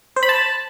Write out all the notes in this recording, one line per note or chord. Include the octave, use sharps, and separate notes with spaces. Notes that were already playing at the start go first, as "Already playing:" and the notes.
C5
B5
A5